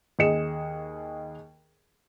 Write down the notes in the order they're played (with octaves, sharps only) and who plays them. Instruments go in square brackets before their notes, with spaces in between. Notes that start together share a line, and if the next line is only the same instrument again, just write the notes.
[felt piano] D#2 G#4 D#5 C#7 E7